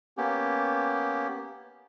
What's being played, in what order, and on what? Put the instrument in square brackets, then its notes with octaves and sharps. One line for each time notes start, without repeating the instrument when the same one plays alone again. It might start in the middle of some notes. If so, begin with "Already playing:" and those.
[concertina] A#3 B3 C#4 G4